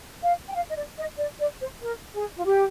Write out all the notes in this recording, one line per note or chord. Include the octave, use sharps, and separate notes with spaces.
F5
G5
F5
D#5
D5
D#5
D5
D5
C5
A#4
G#4
F4
G4